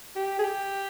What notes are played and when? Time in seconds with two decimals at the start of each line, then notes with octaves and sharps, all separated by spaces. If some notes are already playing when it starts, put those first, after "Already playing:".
0.16 G4
0.39 G#4
0.44 G4